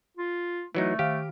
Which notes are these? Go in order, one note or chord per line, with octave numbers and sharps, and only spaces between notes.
F4
E3 F#3 A3 D#4
D#3 G4 F5 F6